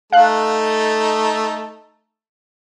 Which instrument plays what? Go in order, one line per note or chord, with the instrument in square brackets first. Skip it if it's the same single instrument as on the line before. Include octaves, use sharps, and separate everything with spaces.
[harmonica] A3 D#4 A4 [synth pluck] F5 F#6